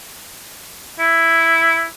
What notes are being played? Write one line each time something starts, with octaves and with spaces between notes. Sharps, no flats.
E4